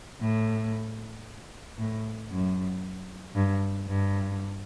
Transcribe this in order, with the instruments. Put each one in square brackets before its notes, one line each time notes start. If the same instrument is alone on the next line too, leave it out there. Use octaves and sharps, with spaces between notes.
[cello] A2
A2
F#2
G2
G2